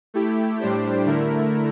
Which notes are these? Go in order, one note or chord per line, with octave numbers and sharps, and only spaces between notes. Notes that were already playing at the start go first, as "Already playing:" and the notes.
A3 E4 G4
A2 G3 D4 G4 C5
D3 A3 E4 A#4